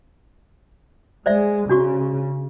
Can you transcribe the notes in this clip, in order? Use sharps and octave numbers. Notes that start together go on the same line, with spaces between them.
G#3 C5 D5 E5
C#3 D4 F#4 C#6